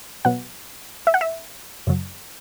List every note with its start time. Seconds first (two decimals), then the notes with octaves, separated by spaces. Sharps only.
0.25 B2 F#3 B3 F#5
1.07 E5
1.14 F#5
1.21 E5
1.87 F#2 C#3 F#3